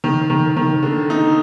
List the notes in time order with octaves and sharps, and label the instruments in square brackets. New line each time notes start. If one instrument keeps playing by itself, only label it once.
[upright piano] D#3
D#3
D#3
D3
D#4